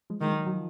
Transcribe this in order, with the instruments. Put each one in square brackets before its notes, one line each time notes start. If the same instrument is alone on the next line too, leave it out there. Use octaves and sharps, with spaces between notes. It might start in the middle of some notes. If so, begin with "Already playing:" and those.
[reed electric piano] F3 G#3
[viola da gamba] D#3 [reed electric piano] G#3
[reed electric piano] F#3
F#3
F3